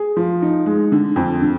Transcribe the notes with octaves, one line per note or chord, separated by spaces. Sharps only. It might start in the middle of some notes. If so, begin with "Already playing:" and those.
Already playing: G#4
F3
D#4
G#3
D3
F2
D3